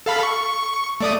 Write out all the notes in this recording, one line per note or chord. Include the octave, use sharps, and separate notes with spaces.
A4 F5 B5
C#6
A3 D5 D#6